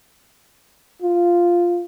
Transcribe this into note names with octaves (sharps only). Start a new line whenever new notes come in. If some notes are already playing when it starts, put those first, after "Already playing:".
F4